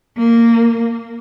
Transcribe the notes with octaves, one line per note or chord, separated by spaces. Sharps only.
A#3